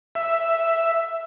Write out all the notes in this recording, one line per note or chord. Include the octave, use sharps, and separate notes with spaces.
E5